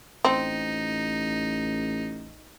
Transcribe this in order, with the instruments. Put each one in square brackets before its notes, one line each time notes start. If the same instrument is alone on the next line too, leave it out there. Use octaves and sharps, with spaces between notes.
[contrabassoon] A1 [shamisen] C4 [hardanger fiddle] D#4